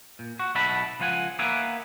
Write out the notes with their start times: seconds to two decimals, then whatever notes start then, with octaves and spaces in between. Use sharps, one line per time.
0.19 A#2
0.39 F#4
0.55 B1 B2 E5 F#5 A5 B5
0.99 C#2 F3 F4 F#5 G#5
1.39 A#3 B3 E5 F#5 G#5